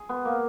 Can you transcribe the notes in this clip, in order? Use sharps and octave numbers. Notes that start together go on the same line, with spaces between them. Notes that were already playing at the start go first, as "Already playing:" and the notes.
Already playing: G#4
B3
A#3